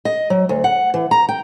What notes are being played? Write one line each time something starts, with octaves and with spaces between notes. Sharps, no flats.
D#5
F#3
D2
F#5
E3
A#5
G5